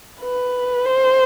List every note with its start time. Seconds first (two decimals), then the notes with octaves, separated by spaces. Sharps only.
0.22 B4
0.86 C5